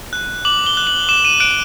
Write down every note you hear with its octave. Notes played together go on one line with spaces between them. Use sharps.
F#6
D6 F#7
G7
F#6
F#7
D6 E7
D#7
F#6 D7